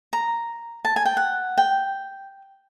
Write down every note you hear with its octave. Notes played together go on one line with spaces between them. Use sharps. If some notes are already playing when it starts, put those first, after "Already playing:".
A#5
A5
G#5
G5
F#5
G5